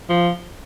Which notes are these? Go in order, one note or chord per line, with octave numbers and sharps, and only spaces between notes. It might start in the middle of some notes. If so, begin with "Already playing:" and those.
F3